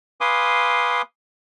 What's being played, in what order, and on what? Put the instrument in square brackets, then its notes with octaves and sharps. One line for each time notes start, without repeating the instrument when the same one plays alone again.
[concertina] B4 F5 G#5 C6 D6 D#6